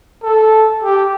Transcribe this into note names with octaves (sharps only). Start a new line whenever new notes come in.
A4
G4